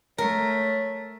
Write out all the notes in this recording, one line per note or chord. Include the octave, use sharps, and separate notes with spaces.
A3 A#4 C#5